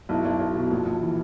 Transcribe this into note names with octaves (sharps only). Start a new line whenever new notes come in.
B1 E4
B1
B1
B2
A#1
A#1
E3